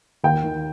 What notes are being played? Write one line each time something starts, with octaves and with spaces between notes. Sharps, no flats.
D#2 G5
D#3